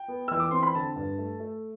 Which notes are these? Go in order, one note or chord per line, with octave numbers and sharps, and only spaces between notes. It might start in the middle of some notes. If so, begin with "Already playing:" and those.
Already playing: G5
B3
E3 E6
D6
C4 C6
B5
D3 A5
G2
A3
A3